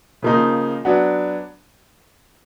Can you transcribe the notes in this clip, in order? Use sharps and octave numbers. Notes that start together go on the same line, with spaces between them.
C#3 F3 A#3 D#4
F#3 B3 D4